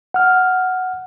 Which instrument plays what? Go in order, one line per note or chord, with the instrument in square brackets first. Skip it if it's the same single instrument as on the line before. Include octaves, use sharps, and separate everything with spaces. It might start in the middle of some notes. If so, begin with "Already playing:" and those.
[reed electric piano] F#5 F6